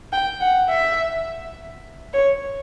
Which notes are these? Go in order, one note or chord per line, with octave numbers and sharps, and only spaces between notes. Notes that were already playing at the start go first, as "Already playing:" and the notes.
G5
F#5
E5
C#5